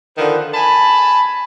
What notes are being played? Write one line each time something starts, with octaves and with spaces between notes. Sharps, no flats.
D3 D#3 F3 B4
G#5 A5 B5